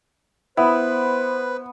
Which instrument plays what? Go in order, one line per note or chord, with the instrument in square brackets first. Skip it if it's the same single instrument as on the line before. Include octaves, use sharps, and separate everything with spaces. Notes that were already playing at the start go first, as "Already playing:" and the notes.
[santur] B3 [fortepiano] E4 [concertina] B4 [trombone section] C5